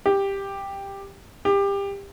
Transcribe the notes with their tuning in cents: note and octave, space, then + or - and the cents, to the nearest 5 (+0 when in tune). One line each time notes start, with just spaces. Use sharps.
G4 +10
G4 +25